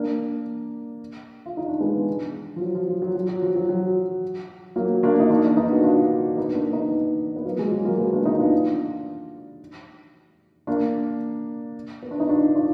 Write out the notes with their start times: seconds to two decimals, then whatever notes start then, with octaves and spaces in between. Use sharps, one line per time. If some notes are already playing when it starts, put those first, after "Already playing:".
Already playing: A#3 D4
1.46 F4
1.57 D#4
1.68 D4
1.80 G#3 B3
2.56 F3
2.61 F#3
2.75 F3
2.88 F#3
3.02 F#3
3.15 F#3
3.28 F#3
3.42 F3
3.56 F#3
3.69 F#3
4.76 F#3 A#3
5.03 A#3 D4
5.20 D#4
5.30 A#3 D4
5.45 D4
5.57 B3 D#4
5.72 F#4
5.84 D4 F4
6.37 B3 D#4
6.55 A#3 D4
6.73 B3 D#4
7.36 B3
7.45 F#3 A#3
7.58 F3 G#3
7.71 F#3
7.85 F#3 A#3
7.98 G#3 B3
8.12 A#3 D4
8.25 B3 D#4
8.38 D4 F4
10.67 A#3 D4
12.03 B3
12.11 D4
12.20 D#4
12.28 D4 F4
12.55 D4 F4